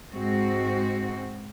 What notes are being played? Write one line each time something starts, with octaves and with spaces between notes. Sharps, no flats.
G#2 G#3 C4 F#4